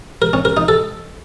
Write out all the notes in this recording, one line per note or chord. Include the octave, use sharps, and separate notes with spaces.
A#4
C#4
A#4
D#4
A4